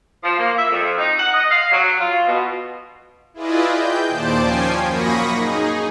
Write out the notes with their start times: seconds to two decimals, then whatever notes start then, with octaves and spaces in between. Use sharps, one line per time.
0.23 F3
0.39 A#3
0.57 E5
0.71 F2
0.98 D#4
1.19 F#5
1.34 D#5
1.51 F5
1.72 F#3
1.99 F4
2.27 B2
3.34 E4 F4 G#4 B4 D5 D#5
3.71 G5 G6
4.08 D#2 A#2 C5 D5 A5 D7
4.40 F3 C#4 G5 G#5 C7
4.84 F#2 A#3 B5 C#6 D#6 A#6
5.33 D#4 G#4